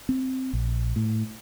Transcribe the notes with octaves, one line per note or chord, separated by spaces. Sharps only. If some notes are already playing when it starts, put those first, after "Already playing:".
C4
A#1
A2